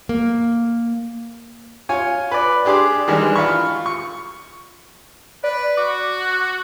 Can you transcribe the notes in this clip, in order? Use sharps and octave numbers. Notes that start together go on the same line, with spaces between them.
A#3
F4 C#5 G#5
B4 D5
D4 G4 G#4 C6 D6
D#3 E3 G3 G#3 D4
F4 F5 B5 C#6
C#6
B4 D5
F#4 D6